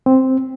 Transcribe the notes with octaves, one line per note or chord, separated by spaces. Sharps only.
C4